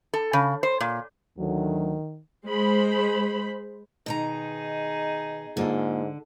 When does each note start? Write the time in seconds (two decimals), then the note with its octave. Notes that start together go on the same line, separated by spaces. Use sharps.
0.14 A4
0.33 C#3
0.63 C5
0.80 A#2
1.38 D2 D#3 F#3
2.45 G#3 C5 B5
4.06 B2 D#3 D#4 G#4 A#5
5.57 G#2 D3 A#3 F4 A4